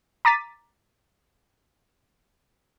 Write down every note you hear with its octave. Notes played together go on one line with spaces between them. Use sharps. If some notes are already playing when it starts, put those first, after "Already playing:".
A#5 D6 A6 B6 D#7